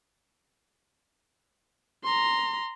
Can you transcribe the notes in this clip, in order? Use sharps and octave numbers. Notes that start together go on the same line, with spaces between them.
A#5 C6